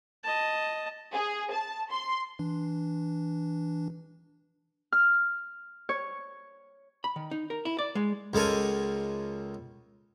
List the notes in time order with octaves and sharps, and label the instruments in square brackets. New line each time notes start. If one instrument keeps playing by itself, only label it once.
[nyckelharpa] D#5 A5
[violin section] G#4
A5
C6
[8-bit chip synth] E3 D4
[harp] F6
C#5
[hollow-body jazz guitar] B5
D#3
D#4
A#4
E4
D5
G#3
[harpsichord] C#2 G#3 A4 A#4 G#5